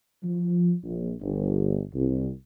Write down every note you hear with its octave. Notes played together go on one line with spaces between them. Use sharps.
F3
A#1
G1
C2